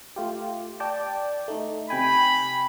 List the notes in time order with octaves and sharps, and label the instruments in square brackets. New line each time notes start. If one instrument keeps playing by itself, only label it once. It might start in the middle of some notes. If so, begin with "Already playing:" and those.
[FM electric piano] A3 F4 G4
D5 G5 A5
A3 D#4
[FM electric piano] C3 G5 G#5 [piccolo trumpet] B5